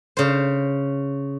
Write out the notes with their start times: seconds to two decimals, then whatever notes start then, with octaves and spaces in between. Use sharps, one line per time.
0.17 C#3 C5